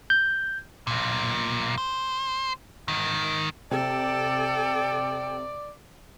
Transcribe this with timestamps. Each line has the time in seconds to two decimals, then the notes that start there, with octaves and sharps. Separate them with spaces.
0.10 G6
0.87 B1 A#2
1.78 C5
2.88 G#2 D#3
3.71 C3 A4 D5 G5